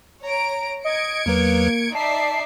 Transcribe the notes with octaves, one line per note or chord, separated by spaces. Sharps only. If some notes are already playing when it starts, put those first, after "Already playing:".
C#5 A#5 D7
D#5 G#6 C#7 D7
E2 F#3 A#3 B4
D#4 D5 E5 A5 C7